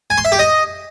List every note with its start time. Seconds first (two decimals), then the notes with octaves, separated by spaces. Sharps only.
0.10 G#5
0.18 C6
0.25 E5
0.32 G4
0.39 D#5